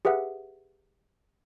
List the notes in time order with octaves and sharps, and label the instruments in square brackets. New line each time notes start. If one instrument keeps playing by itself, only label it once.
[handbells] G4 G#4 B4 E5 F#5